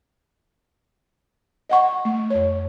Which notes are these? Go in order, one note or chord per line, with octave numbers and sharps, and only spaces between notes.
D#5 F#5 C#6
A3
F2 C#5